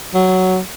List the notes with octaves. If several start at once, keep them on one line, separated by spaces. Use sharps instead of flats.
F#3